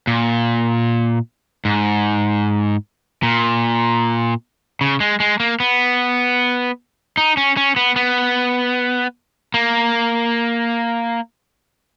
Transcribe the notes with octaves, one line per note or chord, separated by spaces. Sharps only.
A#2
G#2
A#2
C#3
G#3
G#3
A#3
B3
D#4
C#4
C#4
B3
B3
A#3